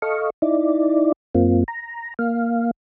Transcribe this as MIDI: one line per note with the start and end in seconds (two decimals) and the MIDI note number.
0.02 0.30 69
0.02 0.30 75
0.02 0.30 77
0.02 0.30 85
0.42 1.12 63
0.42 1.12 64
0.42 1.12 74
1.35 1.64 42
1.35 1.64 58
1.35 1.64 60
1.35 1.64 65
1.68 2.14 82
2.19 2.71 58
2.19 2.71 77